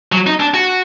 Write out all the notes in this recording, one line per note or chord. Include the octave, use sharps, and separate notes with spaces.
F#3
D#4
D4
F#4